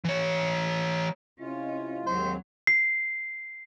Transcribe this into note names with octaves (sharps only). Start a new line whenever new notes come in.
E3 C#5
C3 C#4 E4 F4 D#5
D#2 G#2 F#3 C4 C5
C7